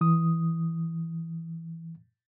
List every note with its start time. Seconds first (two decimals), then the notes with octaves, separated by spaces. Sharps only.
0.01 E3 D#6